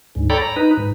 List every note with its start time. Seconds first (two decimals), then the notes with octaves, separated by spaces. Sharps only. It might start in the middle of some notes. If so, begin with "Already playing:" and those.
0.15 D2 G#2
0.30 A4 C#5 D5 G5 A#5 B5
0.41 A#5
0.56 D#4 B4
0.77 G#2